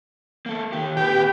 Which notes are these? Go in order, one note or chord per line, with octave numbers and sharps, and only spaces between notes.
A#3 A4
D#3 G4
A#2 G4 B4